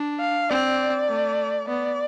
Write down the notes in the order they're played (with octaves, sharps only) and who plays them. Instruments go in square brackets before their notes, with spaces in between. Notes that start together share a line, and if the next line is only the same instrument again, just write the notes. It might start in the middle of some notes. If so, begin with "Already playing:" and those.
Already playing: [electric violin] D4
[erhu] F5
[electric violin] C4 [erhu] D5
[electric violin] A3
[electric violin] B3 [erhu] D5